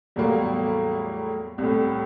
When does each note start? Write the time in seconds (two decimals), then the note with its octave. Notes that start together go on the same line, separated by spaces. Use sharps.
0.16 E2 A2 F#3 G3 A#3
1.58 C2 A2